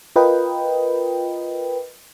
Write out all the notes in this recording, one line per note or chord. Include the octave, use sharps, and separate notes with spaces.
F4 A#4 B4 D#5 G5